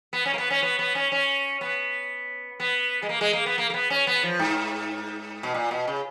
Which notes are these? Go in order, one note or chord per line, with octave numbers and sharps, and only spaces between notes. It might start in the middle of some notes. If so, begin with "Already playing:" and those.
B3
C#4
A#3
B3
C#4
B3
B3
C#4
C#4
B3
B3
G#3
A#3
G#3
A#3
B3
A#3
A#3
B3
C#4
B3
F3
G#2
B2
A#2
B2
C#3